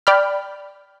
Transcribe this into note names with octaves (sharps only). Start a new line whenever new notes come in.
D5 G5 B5 F6